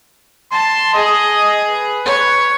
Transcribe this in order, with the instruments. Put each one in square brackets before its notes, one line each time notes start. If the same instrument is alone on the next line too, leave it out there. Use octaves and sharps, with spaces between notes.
[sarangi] A5 [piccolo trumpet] C6
[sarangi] G#4 [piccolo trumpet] D#5
[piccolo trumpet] B4
[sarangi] C#5